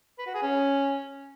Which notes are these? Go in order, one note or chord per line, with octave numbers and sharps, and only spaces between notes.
B4
F#4
G#4
C#4